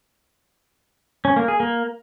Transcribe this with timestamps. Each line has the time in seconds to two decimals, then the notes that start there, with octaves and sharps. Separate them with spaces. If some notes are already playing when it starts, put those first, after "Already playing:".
1.25 C#4
1.36 A#3
1.48 G#4
1.60 A#3